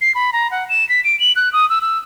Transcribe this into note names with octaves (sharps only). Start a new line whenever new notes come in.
C7
B5
A#5
F#5
E7
B6
D7
F#7
F#6
D#6
E6
E6